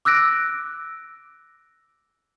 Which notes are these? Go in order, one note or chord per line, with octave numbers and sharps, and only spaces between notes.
D6 E6 F#6 A#6 D7